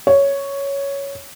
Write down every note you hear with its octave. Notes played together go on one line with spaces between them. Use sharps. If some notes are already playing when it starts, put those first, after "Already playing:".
C#5